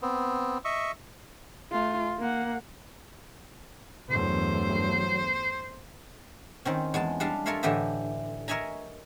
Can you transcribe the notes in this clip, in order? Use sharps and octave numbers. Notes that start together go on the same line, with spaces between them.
B3 C4
D#5 E5 C#6
A3 F4
A#3 F#5
E2 G2 F#3 A3 C5
D#3 C4 C#4
E2 G#3 A5
G3 G#3 D4 F5 A5
F4 A4 A#4 C#5 E5 F5
A2 D3 E3 G4 D#5 E5
A#4 C#5 D#5 E5 G#5 A#5